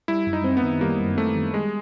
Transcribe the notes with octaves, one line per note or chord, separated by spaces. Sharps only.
G3 E4
F#2
D#4
C4
B3
D#3
G3 A#3
F#2
A3 C4
D#3
G3 G#3